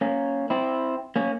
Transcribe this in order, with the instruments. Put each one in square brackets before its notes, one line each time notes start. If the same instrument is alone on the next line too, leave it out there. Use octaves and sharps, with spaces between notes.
[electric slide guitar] A#3 C#4
C4 E4
A#3 C#4